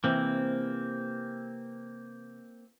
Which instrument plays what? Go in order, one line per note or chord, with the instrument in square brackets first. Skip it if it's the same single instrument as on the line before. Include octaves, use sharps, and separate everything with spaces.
[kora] C3 E3 G4 [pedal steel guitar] A#3 C4